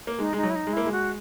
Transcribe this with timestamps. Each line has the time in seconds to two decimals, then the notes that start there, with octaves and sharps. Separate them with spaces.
0.07 A#3
0.19 G#3 D#4
0.33 G#3 D#4
0.43 F#3
0.50 E4
0.55 D#4
0.67 G#3
0.73 A#3 E4
0.86 G#3
0.92 F#4